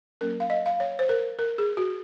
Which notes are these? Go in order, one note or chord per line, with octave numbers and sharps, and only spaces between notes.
F#3 A#3 C#4 A#4
F5
D#5
F5
C#5
C5
A#4
A#4
G#4
F#4